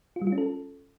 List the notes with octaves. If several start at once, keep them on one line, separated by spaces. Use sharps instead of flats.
F4
G3
F4
C#4
A4